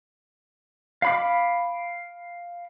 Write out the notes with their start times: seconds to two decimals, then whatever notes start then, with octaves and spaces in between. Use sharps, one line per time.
1.02 F5 B5 D6